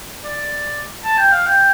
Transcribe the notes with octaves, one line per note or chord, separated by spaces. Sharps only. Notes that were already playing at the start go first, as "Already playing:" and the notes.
D5
A5
G5
F5
G5